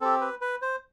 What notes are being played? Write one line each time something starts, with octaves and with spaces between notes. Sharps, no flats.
C4 G4 A4
B4
B4
C5